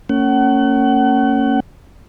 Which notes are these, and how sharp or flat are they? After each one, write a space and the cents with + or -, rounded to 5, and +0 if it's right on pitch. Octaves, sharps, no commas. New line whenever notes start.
A#3 -40 C#4 -5 F#5 +35